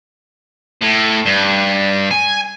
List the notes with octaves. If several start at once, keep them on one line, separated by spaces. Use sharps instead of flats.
A2
G2
G#5